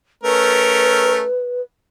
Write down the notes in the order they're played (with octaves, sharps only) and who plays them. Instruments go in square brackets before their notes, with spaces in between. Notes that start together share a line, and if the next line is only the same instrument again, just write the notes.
[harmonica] A3 C#4 A#4 [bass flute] B4